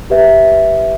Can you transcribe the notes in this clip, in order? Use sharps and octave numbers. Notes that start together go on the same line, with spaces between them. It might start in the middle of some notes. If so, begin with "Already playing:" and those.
G4 B4 E5